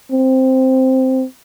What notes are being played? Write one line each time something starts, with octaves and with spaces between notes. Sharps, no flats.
C4